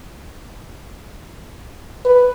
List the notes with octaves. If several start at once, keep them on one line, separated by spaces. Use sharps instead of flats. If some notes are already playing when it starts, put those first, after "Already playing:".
B4